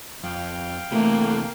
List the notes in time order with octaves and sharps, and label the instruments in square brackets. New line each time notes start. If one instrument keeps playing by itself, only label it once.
[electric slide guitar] F2 [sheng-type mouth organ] F5 G5
[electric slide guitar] C3 E3 [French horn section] A3 [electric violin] A#3